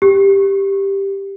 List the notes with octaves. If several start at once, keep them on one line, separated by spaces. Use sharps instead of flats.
G4